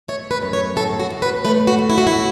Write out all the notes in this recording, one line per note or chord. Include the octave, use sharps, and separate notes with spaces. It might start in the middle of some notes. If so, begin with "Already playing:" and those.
A3 C#5
B4
F#2
C#5
A2 A4
F#4
A2
B4
A3 B4
F#4
A2
E4
F#4
E4